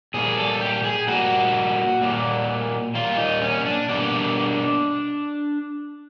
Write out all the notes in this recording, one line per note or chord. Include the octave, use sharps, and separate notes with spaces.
A#2 G3 A#3 G#4
A4
G4
G#4
A#2 G3 A#3 F#4
A#2 G3 A#3
A#2 G3 A#3 F4
D#4
C#4
D4
B2 G3 A#3 D4